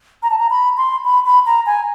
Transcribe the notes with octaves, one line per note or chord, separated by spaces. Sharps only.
A#5
A5
A#5
B5
C6
B5
B5
A#5
G#5